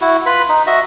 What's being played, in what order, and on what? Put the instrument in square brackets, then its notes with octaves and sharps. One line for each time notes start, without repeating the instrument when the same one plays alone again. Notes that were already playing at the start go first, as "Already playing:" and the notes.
[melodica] E4 F#4
F4 B4 B5
D#4
F#4 D#5 E5